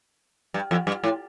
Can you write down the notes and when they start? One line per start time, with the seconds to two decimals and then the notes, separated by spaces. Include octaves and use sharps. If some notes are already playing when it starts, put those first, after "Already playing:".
0.54 G2
0.71 F2
0.87 G2
1.04 A2